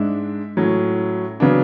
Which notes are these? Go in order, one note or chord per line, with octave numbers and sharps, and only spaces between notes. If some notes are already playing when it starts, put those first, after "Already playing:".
Already playing: G#2 G#3 D4 E5
A2 F#3 C#4
C#3 F#3 B3 D4